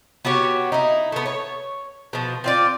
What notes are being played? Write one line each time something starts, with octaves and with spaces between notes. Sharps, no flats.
B3 F#4 G4 C#5
D#4 E4
A3 B3
C#5
B2 F3
C4 F4 D5